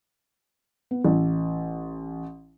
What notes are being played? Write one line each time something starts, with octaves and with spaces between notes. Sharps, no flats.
B3
A1